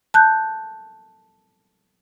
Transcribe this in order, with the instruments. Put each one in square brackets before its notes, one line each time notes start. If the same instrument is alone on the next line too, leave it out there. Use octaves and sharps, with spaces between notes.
[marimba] A5 F#6 G6